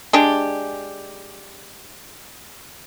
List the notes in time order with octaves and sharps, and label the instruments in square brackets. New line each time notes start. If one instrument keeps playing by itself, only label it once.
[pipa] G#3 D4 G4